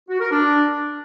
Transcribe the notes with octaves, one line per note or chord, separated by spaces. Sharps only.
F#4
A#4
D4